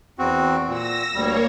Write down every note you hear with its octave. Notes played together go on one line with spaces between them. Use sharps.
E2 C4 F#4
A#2 E6 A#6
D2 G3 A#3 C#5